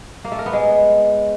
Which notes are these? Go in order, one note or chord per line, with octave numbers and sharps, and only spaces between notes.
A#3
A3
A#4
B3
G#3